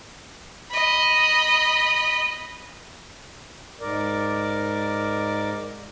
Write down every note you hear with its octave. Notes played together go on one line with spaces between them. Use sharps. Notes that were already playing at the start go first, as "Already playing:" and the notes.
D#5 B5
G#2 A#4 D5